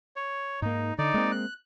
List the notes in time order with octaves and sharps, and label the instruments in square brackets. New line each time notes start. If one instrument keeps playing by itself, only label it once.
[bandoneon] C#5
[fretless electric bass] G#2 A#3 [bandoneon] D#4
[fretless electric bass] D3 [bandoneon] D#4 D5
[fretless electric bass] G#3 A#3 C4
[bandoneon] F#6